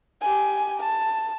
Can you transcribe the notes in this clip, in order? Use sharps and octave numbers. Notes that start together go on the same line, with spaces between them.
G4 G#5
A5